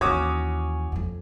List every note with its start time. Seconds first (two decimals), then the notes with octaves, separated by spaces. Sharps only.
0.01 D#2 E3 C#4 F#4 C#5 D6 D#6
0.92 F2 F3